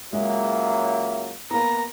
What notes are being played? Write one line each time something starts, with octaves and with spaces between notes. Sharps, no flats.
C#2 F#3 G#3 A#3 E5
A#3 B3 A#5